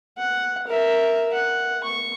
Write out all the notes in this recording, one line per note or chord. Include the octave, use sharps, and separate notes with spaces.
F#5
A#4 E5
F#5
C#6